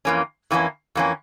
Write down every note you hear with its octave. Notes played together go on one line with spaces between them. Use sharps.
F2 E3 A#3 C#4
F2 E3 A#3 C#4
F2 E3 A#3 C#4